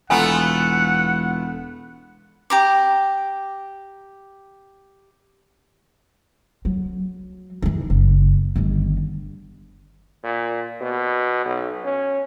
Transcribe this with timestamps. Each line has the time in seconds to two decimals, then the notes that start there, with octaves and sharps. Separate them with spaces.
0.10 E1 A3 B3 F4 F#5 G#5 A#5
2.50 G4 A#5 D6
6.65 F#3
7.62 E3 D#4
7.90 F#1
8.56 G1 D#3
10.23 A#2
10.81 B2
11.45 B1
11.84 C#4